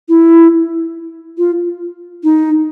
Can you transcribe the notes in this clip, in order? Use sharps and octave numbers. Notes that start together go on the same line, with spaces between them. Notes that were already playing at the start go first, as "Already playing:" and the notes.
E4
F4
D#4